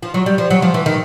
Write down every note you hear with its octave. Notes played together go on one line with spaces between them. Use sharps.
F3
F#3
G3
F3
F#3
F3
E3
D#3